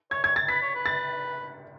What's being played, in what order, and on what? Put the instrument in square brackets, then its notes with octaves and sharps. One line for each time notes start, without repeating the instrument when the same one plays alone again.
[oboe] C#5 [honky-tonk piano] G#6
[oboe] C#5 [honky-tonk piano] G#6
[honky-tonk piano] A6
[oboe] B4 [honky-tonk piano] B6
[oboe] C#5
B4
[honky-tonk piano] A6